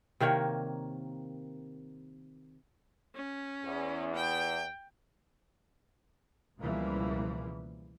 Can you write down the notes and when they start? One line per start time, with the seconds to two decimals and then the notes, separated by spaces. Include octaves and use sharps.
0.20 C3 D#3 A#3 C#5
3.15 C#4
3.65 E2
4.15 G5
6.59 C#2 B2 E3 F3 G3 A#3